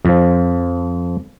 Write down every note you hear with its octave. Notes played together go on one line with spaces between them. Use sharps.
F2 F3